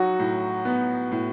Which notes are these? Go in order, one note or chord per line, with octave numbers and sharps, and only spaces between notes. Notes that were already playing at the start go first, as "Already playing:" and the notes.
Already playing: F#3 D#4 F#4
A2
B3
A2